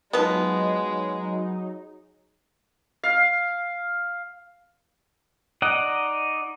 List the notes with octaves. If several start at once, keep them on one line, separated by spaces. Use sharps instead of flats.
F3 F#3 G#3 B3 D#4
F5
D#4 D5 D#5 F#5